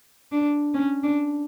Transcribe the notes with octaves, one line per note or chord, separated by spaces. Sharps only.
D4
C#4
D4